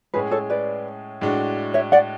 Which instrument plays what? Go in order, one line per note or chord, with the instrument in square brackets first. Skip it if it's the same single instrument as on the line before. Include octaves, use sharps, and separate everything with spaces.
[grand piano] A2 G#3 C#4 G#4 [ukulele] B4
[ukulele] A4 C#5
B4 D5
[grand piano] A2 G#3 D4 F#4
[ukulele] C#5 E5
D5 F#5